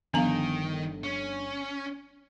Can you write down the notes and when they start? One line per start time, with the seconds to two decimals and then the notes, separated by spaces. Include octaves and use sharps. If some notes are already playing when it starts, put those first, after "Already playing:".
0.14 G1 D3 D#3 F3 B3 F5 A#5 F7
1.04 C#4